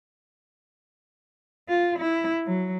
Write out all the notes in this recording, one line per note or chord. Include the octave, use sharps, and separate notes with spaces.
F4
E4
F#3